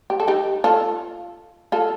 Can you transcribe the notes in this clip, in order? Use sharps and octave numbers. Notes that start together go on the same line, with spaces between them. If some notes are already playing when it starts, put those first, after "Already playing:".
G4
A4
D#4 G4
F4 A4
F4 A4